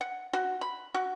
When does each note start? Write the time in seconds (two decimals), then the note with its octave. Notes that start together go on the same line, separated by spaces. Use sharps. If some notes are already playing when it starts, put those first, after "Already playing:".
0.01 F#5
0.33 F#4
0.61 B5
0.94 F#4